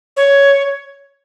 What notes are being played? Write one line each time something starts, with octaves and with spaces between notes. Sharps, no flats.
C#5